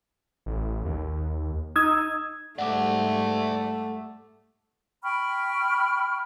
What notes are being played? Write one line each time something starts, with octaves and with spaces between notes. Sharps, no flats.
A1
D#2
D#4 D#6 E6 G#6
G#2 G3 A3 D5 E5 F#5 D6
G5 B5 C#6 F6